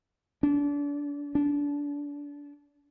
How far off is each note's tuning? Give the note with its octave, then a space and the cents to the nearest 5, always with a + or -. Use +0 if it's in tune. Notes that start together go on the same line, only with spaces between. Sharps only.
D4 -30
D4 -25